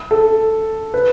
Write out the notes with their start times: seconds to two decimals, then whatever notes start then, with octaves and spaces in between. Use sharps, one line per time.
0.11 A4
0.94 B4